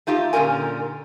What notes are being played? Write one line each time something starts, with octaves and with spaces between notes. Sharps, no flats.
A3 D#4 F4 G4
A#2 D3 C#4 G4 A#4 G#5